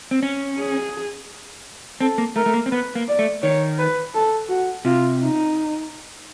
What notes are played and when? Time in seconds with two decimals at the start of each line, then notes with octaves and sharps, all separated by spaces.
0.11 C4
0.23 C#4
0.58 G#4
2.00 C4 A4
2.18 A#3
2.36 A3 A#4
2.46 A3
2.54 A#3
2.66 C4
2.71 B3 B4
2.95 A#3
3.08 D5
3.19 A3
3.43 D#3 C#5
3.79 B4
4.14 A4
4.49 F#4
4.85 C3 F4
5.20 D#4